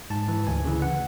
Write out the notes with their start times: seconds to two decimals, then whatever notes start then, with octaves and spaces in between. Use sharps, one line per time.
0.10 G#2 A5
0.28 E3
0.47 D2 G#5
0.65 C#3 E3
0.82 F#5